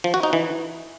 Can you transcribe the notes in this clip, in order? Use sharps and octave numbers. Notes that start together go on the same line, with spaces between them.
F3
F#4
D#4
E3